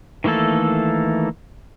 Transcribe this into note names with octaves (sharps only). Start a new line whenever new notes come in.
D#3 E3 A3 A#3 A4